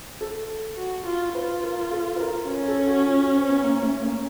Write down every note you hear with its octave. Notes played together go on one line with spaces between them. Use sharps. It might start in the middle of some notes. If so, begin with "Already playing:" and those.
A4
F#4
F4
F4 B4
A#4
A4
B4
A#4
C#4 A#4
A4
F#4
F4
F#4
C4
B3
A#3
A3
A#3